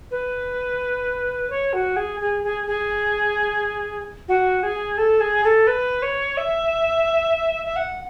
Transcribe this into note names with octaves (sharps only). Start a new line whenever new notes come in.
B4
C#5
F#4
G#4
G#4
G#4
G#4
F#4
G#4
A4
G#4
A4
B4
C#5
E5
E5
F#5